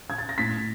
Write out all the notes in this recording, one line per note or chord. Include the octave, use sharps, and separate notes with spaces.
G#6
A6
A#6
A2 A6 B6